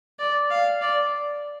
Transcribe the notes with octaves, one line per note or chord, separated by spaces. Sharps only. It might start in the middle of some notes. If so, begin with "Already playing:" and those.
D5
F5
D5